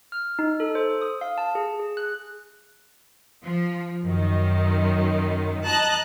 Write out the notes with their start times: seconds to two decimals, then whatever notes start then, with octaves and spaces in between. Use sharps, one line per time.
0.12 F6
0.39 D#4
0.60 A4
0.75 C5
1.02 D#6
1.21 F5
1.38 A5
1.55 G#4
1.80 G#4
1.97 F#6
3.44 F3
4.04 F#2 D#3
5.66 D#5 A5 A#5 F#6